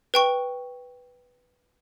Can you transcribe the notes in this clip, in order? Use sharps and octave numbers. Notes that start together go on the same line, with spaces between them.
B4 G5 C#6